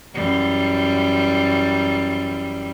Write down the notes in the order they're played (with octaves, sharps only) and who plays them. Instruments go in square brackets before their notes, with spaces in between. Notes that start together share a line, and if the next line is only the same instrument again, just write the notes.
[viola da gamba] F#2 E3 G3